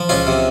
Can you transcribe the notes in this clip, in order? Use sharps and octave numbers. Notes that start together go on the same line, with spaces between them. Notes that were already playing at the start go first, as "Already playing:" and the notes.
Already playing: F3
C#2 C#4 F4
C3